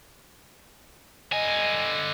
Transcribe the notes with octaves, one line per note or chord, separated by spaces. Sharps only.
D3 D#5 G#5